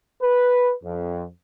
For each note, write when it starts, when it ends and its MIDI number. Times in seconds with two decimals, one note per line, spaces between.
0.21 0.73 71
0.82 1.25 41